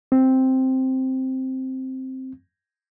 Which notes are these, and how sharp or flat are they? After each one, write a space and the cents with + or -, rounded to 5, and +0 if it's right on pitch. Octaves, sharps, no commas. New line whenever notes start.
C4 +0